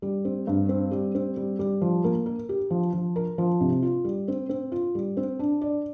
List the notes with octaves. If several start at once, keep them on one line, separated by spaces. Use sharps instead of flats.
G3
C4
G2
C4
G3
C4
G3
G3
F3
A#3
A#4
G4
F3
F3
A#4
F3
C3
F4
G3
C4
C4
F4
G3
C4
D4
D5